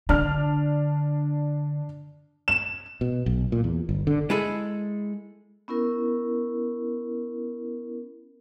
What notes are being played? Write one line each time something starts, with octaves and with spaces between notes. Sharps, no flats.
D3 D4 F6
E7
B2
B1
A#2
E2
G1
D3
G#3 E4 G#4 A4
B3 C#4 E4 A#4